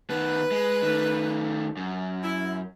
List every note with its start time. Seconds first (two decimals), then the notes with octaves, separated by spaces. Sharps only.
0.10 D#3 B3 B4
0.51 G#3
0.82 D#3 A3
1.77 F#2
2.23 E4